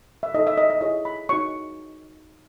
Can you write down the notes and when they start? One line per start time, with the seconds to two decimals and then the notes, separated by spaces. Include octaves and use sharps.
0.23 E5
0.34 D#4 A4 C#5 D#5
0.47 E5
0.57 D#5
0.70 D#5
0.81 E4 G#4 C#5 D#5
1.05 B5
1.29 D#4 F#4 C#5 C#6